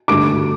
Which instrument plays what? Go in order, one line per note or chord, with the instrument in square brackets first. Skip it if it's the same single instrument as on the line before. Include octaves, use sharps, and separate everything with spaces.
[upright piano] G2 D3 A3 D6 D7